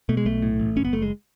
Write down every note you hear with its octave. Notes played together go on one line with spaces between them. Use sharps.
B2 A3
G#3
B1 A3
A2
A1
F#1 C#4
B3
F#1 A3
G#3